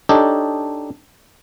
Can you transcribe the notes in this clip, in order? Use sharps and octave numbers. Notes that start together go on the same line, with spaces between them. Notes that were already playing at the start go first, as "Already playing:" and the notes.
D4 D#4 G4 A4 C#5 D#5